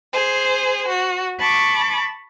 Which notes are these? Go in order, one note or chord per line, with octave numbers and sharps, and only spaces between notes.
G#4 C5
F#4
A5 B5 C#6 D6